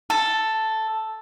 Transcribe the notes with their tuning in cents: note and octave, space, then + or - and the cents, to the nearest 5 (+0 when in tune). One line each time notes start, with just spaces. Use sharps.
A4 +0